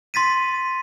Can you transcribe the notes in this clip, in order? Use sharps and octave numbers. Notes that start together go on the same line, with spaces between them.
C6 A6 B6 D#7